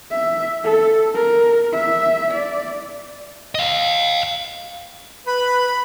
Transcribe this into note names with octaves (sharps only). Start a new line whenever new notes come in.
E5
A4
A#4
E5
D5
D#5 F5
B4 B5